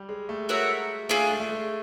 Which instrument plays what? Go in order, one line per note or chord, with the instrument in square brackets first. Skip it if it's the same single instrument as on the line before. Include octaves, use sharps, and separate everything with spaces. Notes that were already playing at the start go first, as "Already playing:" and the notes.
Already playing: [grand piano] G3
G#3
A3
[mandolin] F#4 A#4 C#5 E5
[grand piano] A3 [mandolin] D4 F4 G#4
[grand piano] G#3
A3
G#3